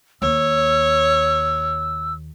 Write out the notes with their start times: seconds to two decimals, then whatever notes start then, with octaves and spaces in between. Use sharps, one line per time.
0.22 D#2 C#5 E6